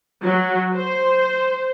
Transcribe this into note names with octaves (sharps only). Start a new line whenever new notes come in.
F#3
C5